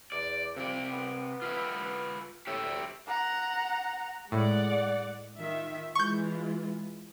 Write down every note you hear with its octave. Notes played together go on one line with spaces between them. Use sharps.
E2 D5
C3 F3 D5
B3
F4 B4 E5
A2 G4 C#5 E5
D2
F#5 A#5
A2 G#3 D5 F#5
D#3 F4 E5
E3 G#3 F4 C#6 G6